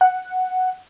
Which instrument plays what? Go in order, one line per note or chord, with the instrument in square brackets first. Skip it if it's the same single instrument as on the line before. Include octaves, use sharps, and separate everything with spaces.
[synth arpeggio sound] F#5